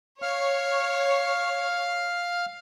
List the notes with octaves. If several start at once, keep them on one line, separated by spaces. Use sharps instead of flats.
C#5 F5 F6